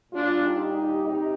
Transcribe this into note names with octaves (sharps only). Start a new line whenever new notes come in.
A#2 G3 D4 F4
D#4 G4
D#4 G4
C3 D#4 G4